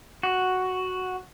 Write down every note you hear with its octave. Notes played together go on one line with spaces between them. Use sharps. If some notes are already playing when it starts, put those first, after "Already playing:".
F#4